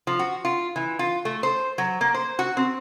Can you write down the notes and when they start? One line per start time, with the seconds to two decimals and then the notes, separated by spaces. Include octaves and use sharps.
0.07 F3
0.19 F#4
0.45 F4
0.76 E3
0.99 F4
1.25 A3
1.43 C5
1.78 F#3
2.01 A#3
2.14 C5
2.39 F#4
2.57 C4